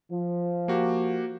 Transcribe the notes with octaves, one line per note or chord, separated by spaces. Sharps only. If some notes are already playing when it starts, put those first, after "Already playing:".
F3
A#3 F#4 G4